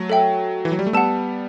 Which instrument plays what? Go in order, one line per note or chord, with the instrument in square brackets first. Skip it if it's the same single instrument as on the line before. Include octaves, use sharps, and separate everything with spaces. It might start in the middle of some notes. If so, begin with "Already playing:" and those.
Already playing: [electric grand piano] F#3 A3
[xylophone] A4 E5 G5
[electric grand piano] E3
F#3
G3
A3
[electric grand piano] G3 B3 [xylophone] F#5 A5 E6